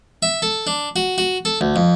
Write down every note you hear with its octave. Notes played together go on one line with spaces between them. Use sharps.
E5
A4
D4
F#4
F#4
A4
D2
F2